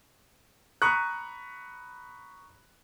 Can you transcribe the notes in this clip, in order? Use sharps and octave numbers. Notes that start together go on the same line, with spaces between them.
A#5 B5 C#6 D#6 F#6